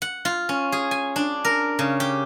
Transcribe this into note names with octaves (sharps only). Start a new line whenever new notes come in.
F#5
F4
C#4
G#4
G#5
D4
A#4
C#3
G4